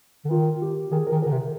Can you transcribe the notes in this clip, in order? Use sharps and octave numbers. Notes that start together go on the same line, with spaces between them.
D3
D#3 F4
G4
D#3 G#4
D#3 A#4
D3 A#4
C3
A#4